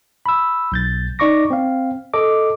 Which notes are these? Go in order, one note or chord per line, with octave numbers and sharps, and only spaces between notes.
B5 E6
B1 G6 A6
D#4 D5 C#6 D6 A#6
C4 F5
A4 D#5 D6